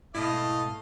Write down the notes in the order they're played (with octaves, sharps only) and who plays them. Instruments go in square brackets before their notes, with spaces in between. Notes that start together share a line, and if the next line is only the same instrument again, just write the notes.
[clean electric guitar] G#2 B2 [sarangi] A3 [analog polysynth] E4 [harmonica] D#5 F5